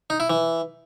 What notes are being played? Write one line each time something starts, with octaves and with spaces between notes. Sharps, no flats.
D#4
E4
E3